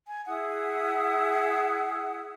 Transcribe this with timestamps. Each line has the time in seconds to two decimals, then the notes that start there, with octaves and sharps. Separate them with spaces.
0.09 G#5
0.27 E4 G#4 F#5 D#6